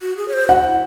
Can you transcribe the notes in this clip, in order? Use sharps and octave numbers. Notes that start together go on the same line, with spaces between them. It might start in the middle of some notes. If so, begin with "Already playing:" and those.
F#4
G#4
C#5
C5
F#4 F#5
E4